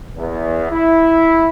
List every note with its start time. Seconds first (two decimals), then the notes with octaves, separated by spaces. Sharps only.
0.16 E2
0.72 E4